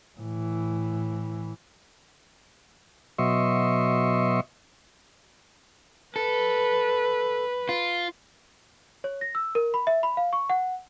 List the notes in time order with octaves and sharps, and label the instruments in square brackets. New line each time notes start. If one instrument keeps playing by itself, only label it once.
[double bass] A2 E3
[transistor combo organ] B2 F#3 D#5 E5 C6 C#6
[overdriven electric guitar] A4 [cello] B4
[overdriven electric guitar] F4
[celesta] C#5
A#6
E6
A#4
B5
E5
B5
F5
C#6
F#5